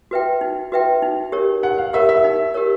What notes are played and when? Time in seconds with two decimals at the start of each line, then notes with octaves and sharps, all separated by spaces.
0.11 F#4 B4 E5 G5
0.41 D#4
0.72 F#4 B4 E5 G5
1.02 D#4
1.32 G4 A#4 C#5
1.63 D#4 F#5
1.78 F5
1.93 G4 A#4 C#5 E5
2.09 E5
2.24 D#4
2.54 G4 A#4 C#5